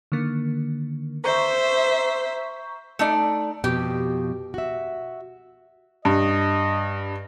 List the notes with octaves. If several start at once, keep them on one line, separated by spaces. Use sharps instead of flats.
D3 D#3 A#3
C5 E5 A#5 C#6 G6
A3 D#4 D5
F2 B2 G4
F#4 E5
G2 D#5